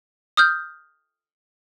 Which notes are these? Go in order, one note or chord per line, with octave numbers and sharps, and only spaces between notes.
D#6 F6 G6